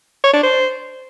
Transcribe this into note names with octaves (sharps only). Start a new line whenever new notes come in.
C#5
D4
C5